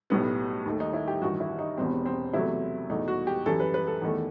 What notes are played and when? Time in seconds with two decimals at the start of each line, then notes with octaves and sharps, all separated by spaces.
0.10 B1 A2 G3 B3
0.66 D#2 D#3 A3
0.80 D#4
0.93 E4
1.08 G4
1.22 A1 G2 D#3 F#4
1.40 E4
1.59 D#4
1.77 E1 E2 B2 G3 C4
2.06 C4
2.33 E2 C3 F#3 A3 E4
2.90 E2 B2 A3 D#4
3.08 F#4
3.27 G4
3.46 F#2 E3 G3 A4
3.60 B4
3.74 B4
3.87 A4
4.01 E2 D#3 A3